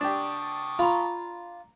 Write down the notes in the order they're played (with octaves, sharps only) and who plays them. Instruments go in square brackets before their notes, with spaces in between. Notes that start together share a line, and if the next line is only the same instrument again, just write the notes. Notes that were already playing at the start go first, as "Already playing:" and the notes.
[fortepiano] D4 G4 [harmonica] A5 C#6 D#6
[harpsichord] F4 [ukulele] A#5 B5